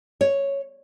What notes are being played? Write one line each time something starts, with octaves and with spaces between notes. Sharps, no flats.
C#5